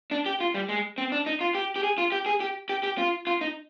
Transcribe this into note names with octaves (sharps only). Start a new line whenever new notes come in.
D4
G4
F4
G3
G#3
C4
D4
D#4
F4
G4
G4
G#4
F4
G4
G#4
G4
G4
G4
F4
F4
D#4